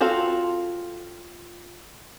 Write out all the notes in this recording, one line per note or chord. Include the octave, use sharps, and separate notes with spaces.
C4 F4 F#4 A4 F5